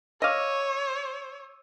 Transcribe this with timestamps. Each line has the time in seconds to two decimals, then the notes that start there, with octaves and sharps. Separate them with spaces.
0.22 C#5 D#5 F5 D6 E6 D#7